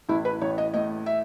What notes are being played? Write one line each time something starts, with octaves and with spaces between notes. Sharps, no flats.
A1 E4
B4
A1 C#5
D#5
A2 D#5
E5